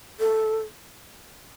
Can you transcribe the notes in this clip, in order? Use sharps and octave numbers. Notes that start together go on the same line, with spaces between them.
A4